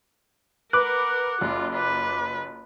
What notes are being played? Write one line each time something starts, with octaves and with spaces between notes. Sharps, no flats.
A#4 B4 F#5 D6 F#6
F#1 F4
F4 B4